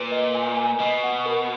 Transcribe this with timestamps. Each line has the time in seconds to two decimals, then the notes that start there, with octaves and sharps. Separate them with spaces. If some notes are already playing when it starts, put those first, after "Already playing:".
Already playing: A#2 B4
0.12 D#5
0.35 G#5
0.57 G#5
0.80 B2 D#5
1.04 F#5
1.26 A#4